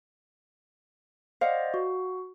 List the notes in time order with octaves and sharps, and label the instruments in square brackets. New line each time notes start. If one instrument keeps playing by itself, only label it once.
[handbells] C5 D5 D#5 [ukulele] F5 F#5
[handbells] F#4